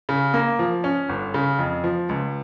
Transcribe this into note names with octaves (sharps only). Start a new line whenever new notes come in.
C#3
A#3
F3
C#4
G1
C#3
F2
F3
C#2